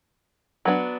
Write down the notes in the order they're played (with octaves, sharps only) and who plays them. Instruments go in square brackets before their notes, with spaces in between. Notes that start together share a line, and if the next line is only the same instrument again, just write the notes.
[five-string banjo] F#3 B3 D4